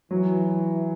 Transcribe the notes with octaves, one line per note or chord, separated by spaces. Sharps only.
E3 F#3